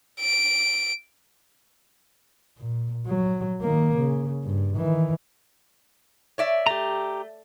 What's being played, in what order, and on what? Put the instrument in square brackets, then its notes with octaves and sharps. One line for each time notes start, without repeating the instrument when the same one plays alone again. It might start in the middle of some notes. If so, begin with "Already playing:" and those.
[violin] D7
[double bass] A#2
F#3
D#3 A#3
C#3
G2
D#3 E3
[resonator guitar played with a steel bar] C#5 D5 E5
[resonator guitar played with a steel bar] A3 [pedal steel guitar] G4 A#5